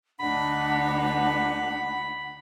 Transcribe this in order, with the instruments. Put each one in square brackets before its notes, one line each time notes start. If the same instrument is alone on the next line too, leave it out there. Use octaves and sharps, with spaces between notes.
[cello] D2 D#4 [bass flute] D4 [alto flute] F#5 [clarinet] B5